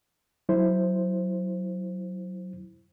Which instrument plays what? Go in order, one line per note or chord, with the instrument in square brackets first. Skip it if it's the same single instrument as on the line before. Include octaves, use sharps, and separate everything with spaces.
[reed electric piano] F#3 E4 C5